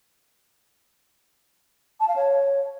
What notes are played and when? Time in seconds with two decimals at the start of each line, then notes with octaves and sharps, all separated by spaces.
2.00 A5
2.08 F5
2.16 C#5